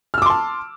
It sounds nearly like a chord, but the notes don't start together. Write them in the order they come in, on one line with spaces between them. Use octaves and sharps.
F6 E6 D6 C6 A5